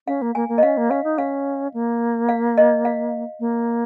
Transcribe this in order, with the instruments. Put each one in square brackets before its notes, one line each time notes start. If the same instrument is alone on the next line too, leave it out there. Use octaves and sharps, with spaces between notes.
[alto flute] C#4 [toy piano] F5
[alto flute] A#3
[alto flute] A#3 [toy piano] G#5
[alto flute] A#3
[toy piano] D#5
[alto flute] C#4 [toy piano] F5
[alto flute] A#3
[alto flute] C#4 [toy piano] F5
[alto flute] D#4
[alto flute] C#4 [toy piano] F5
[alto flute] A#3
[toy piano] F5
D#5
F5
[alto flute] A#3